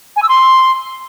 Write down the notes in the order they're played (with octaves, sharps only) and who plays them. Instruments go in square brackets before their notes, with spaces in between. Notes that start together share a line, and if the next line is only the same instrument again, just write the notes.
[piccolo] G#5
E6
C6